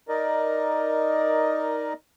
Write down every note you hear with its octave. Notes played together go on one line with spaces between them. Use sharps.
D#4 A#4 D5 D#5